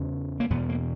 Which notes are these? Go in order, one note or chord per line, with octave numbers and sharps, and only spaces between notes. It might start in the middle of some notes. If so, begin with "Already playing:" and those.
Already playing: E2 C#3
A#3
E2 B2 B3
A#3